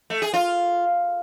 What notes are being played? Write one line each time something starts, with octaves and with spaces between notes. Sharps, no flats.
A3
G#4
F4